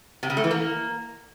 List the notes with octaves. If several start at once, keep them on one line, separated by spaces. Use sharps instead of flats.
C3
C#3
A3
E3
A#3